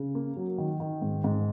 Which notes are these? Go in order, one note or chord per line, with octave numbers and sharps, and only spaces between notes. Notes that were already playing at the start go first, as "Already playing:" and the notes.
Already playing: C#3
A#3
F#3
D#3
D#3
G#2
G#2